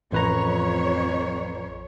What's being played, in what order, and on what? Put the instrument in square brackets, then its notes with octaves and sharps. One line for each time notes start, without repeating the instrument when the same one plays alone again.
[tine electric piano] A1 B4 A#5 [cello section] F2 C#5